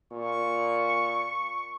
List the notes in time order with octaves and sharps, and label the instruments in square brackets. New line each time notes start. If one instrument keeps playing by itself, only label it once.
[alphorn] A#2 [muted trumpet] C#6